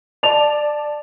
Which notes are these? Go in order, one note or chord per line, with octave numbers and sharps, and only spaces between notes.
D5 A5 F7